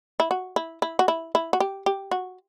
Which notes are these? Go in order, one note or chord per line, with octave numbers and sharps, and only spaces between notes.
E4
F#4
E4
E4
F#4
E4
E4
F#4
G4
G4
F#4